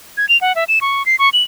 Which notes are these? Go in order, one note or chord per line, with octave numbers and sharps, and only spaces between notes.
G#6
F7
F#5
E5
E7
C#6
C7
C#6
F#7